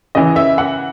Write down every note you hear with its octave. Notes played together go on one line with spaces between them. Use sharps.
C#3 E3 D#5
E5
F#5